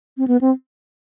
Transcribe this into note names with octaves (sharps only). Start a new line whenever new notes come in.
C4
B3
C4